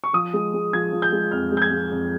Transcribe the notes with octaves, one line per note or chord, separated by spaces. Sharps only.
C#6
F3 D#6
G#3
G#3
F3 G#6
F3
G6
G#3
F2 F6
G#3
G6
G#6
G#3
F2